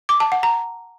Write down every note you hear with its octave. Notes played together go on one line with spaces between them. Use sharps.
D6
A5
F#5
A#5